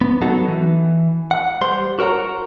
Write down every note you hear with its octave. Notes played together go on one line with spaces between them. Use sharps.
B3
F#3 B3 D#4 F#4 A4
E3
F#5
G3 C5 C6
F#4 A#4 C#5 F#5 A#5